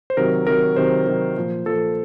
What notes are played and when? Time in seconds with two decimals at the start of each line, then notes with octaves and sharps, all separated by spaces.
0.10 C5
0.17 C3 D#3 F#3 A#4
0.47 C3 D#3 F#3 A#4
0.76 C3 D#3 F#3 C5
1.06 C3 D#3 F#3
1.37 A#2 F3
1.66 A#2 F3 A4